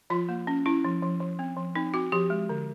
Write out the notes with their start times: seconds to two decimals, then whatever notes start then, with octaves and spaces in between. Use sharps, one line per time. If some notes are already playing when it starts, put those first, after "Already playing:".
0.10 F3 F4
0.29 A#3
0.47 C#4
0.66 C#4 E4
0.85 F3
1.03 F3
1.20 F3
1.39 C4
1.57 F3
1.76 C4 D#4
1.94 C4 F#4
2.12 F3 G4
2.30 G#3
2.49 D3